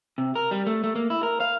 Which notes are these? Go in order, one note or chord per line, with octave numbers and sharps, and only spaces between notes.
C3
A#4
G3
A3
A3
A#3
E4
A#4
F5